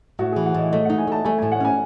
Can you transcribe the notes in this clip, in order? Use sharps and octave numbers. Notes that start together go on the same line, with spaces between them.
A2 F#4
E3 G#4
F#5
A2 D#5
A3 D#5
D#4 F#5
G#5
A3 A5
A3 G#5
A2 G#5
F#5
C#4 G#5